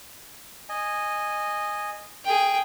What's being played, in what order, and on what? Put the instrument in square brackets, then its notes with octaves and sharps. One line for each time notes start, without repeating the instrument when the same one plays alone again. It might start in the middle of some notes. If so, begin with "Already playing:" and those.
[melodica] D#5 G#5
[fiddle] G#4 G5